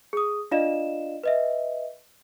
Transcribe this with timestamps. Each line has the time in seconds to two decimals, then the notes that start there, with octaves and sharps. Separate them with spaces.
0.13 G#4 D#6
0.51 D4 F4 D5 D#5 F5 E7
1.24 B4 D#5 E5